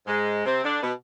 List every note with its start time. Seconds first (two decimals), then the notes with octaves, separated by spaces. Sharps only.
0.07 G#2 G#3
0.45 C3 C4
0.64 D3 D4
0.83 B2 B3